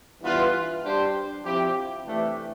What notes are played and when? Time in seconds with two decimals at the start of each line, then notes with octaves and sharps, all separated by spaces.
0.22 G2 E3 B3 F4 B4
0.83 G3 D4 G4 C5
1.45 F3 C4 E4 G4
2.05 C3 E3 A3 D4 G4